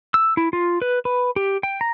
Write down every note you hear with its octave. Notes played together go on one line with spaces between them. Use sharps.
E6
E4
F4
B4
B4
G4
G5
A#5